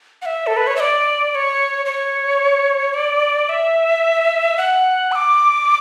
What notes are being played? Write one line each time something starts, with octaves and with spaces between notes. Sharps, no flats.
F#5
E5
A4
B4
C#5
E5
D5
D5
C#5
C#5
D5
E5
F#5
E6
D6